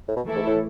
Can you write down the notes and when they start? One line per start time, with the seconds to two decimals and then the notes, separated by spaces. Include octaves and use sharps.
0.08 A2
0.16 B2
0.25 E3 A3 E4 A4
0.36 G#2
0.47 A2